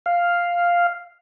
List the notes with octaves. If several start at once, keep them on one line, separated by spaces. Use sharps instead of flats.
F5